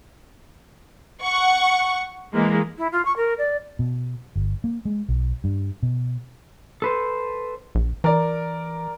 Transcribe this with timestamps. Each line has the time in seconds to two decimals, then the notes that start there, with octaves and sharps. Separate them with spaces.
1.23 F#5 C#6
2.33 E3 G#3 A#3
2.78 E4
2.92 F4
3.05 C#6
3.16 A#4
3.38 D5
3.79 B2
4.36 G1
4.64 A#3
4.85 G#3
5.09 B1
5.44 G2
5.83 B2
6.82 A4 B4 C5
7.75 A#1
8.04 E3 A#4 D5